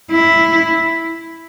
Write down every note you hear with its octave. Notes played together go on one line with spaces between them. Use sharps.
E4